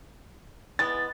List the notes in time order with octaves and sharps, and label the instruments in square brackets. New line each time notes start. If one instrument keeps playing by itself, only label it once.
[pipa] E3 G#3 B3 [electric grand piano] A6